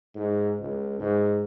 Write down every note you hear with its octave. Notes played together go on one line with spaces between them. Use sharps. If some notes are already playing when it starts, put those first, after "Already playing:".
G#2
C#2
G#2